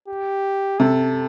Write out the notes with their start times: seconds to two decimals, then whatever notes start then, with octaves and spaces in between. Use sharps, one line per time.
0.08 G4
0.80 C3 A4